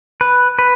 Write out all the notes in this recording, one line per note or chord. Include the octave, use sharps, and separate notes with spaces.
B4
B4